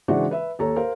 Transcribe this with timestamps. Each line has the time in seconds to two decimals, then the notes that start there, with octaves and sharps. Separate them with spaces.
0.08 C#3 E3 G#3 D4 F#4 C5
0.31 B4 E5
0.59 D#2 A4 C#5 A#5
0.76 A#4 C5 F5